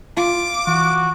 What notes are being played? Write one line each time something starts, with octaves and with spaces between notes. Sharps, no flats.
F4 D6
E3 F#4